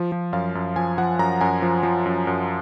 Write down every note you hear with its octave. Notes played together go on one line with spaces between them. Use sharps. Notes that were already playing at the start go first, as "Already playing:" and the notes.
Already playing: F3
F3
F#2 F5
F#2
F3 G#5
F3 F#5
F#2 A#5
F#2 G#5
F3
F3
F#2
F#2